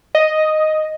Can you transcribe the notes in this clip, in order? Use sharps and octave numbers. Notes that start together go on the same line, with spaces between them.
D#5